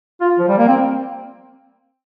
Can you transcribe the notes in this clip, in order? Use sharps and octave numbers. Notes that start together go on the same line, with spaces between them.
F4
F3
G3
A#3
C4